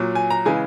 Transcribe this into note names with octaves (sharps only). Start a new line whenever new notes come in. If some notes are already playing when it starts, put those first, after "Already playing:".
Already playing: A#2 F#3
G#5
A#5
C#3 E3 G#3 G#5